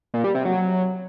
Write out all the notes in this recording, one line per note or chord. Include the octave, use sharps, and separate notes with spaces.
A#2
G3
C3
F#3